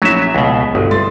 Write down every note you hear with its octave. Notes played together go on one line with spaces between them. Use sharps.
A#1 F#3 C#4 E4 E5
C#2 B2 G#3
G1 F#4 D#6
C2 C6 A6